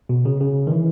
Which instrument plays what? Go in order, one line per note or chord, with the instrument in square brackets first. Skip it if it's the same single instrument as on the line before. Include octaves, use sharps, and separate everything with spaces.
[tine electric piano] B2
C#3
C#3
D#3
E3